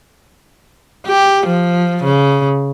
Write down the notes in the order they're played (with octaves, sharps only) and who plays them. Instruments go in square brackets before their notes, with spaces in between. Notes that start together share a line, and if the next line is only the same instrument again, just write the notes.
[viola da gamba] G4
F3
C#3